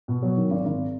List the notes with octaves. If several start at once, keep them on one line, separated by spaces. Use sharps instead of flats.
B2
F#3
D#3
G#1
G#1